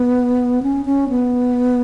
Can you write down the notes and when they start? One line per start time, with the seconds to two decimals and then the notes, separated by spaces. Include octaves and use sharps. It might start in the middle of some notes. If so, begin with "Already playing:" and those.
Already playing: B3
0.63 C#4
0.86 C#4
1.09 B3